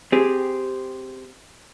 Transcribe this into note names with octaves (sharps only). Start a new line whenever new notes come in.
C4 G4 G#4